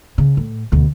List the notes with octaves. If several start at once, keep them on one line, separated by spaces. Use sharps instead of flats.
C#3
A2
D2 B2